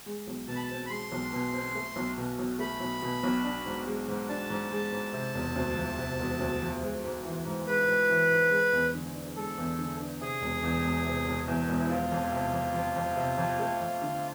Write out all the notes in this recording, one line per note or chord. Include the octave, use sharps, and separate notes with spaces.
G#3
B1
B2 A5
B5
A5
C4
B5
G#3 C6
B1
B2
C4
A3
B1
B2
B1
A3 B5
B1
B2
B1
D4
G#2
G#3
G#2
D4 A5
G#2
G#3
G#2
C3
E1
D2
F3
C3
E1
D2
F3
G#3
G#2
E3
G#2
G#3 B4
G#2
E3
G#2
G#3
E2
D3
D4
G#3 A4
E2
D3
D4
C3 G#4
E1
E2
E1
C3
E1
E2
E1
E4
F3 F4
F2
C3
F2
F3
F2
C3
F2
A3
F2
D3